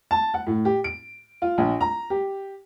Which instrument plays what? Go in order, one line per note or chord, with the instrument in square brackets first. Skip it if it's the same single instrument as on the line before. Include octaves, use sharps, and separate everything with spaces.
[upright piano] A5
F#5
A2
G4
D7
F4
A#1
A#5
G4